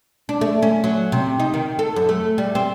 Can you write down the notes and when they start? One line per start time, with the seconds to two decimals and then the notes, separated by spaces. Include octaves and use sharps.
0.29 D4
0.41 A3
0.62 C#4
0.84 F#3
1.12 C3
1.40 D#4
1.54 D#3
1.79 A4
1.96 F#2
2.09 A3
2.38 G3
2.55 C4